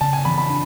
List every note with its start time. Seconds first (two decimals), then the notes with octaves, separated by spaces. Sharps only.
0.01 C#3 A5
0.13 G#5
0.25 E3 B5
0.38 B5
0.50 D4